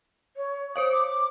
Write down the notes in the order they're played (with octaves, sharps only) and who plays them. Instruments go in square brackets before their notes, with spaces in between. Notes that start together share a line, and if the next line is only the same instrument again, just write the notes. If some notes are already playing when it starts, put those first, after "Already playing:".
[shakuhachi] C#5
[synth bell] C5 C#5 F5 [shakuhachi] D#6
[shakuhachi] D6